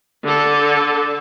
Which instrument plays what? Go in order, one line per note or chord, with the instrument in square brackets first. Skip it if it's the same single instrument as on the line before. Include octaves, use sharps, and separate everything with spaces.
[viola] D3 A4